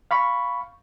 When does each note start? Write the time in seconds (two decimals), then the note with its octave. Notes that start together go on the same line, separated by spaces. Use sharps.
0.11 F5 B5 C#6